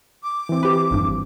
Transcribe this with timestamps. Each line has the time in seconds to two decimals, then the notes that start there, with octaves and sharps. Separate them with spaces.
0.23 D6
0.49 E3 C4
0.63 G4 B4
0.91 G#1 G2